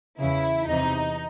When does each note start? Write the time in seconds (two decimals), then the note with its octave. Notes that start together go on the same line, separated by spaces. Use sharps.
0.19 E2 C#3 E3 E4
0.67 E2 C3 E3 D#4